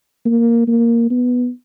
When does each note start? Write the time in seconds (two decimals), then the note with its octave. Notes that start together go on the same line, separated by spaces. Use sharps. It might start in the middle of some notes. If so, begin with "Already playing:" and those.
0.26 A#3
0.68 A#3
1.11 B3